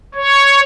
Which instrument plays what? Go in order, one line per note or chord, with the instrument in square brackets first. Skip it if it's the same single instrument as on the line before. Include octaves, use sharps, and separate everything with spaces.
[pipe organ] C#5